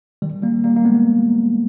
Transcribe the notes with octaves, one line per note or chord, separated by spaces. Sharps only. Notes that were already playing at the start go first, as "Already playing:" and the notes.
D#3 G3
G3 A#3
G3 A#3
A#3
G#3 B3